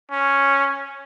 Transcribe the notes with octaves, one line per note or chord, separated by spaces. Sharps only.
C#4